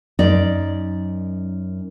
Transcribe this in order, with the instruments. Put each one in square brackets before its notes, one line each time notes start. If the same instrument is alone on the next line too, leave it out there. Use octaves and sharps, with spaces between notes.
[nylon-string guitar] F#2 D#4 D5